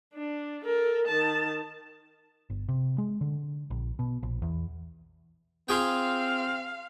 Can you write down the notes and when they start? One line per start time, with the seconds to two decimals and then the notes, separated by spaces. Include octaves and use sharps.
0.14 D4
0.64 A4 A#4
1.07 D#3 A5
2.50 G1
2.68 C3
2.98 G#3
3.21 D3
3.70 A#1
3.99 B2
4.23 A#1
4.42 E2
5.69 C4 F4 G#4 F5 G5